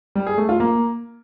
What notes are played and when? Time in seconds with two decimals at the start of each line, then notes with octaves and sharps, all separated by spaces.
0.15 G3
0.27 G#4
0.38 A3
0.49 F4
0.60 A#3